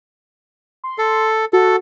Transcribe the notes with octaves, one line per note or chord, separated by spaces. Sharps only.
C6
A4
F#4 A4